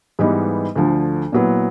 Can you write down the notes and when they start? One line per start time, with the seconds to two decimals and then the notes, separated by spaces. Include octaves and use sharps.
0.19 G#2 E3 G3 B3 D#4
0.76 D2 D3 F3
1.32 A#2 F#3 B3 E4